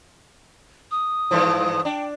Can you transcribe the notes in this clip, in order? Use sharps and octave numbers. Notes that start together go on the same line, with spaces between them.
D#6
G2 E3 F3
D4 G5